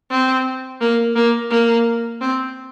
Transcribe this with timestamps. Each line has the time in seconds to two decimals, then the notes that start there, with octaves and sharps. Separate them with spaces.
0.11 C4
0.81 A#3
1.16 A#3
1.50 A#3
2.21 C4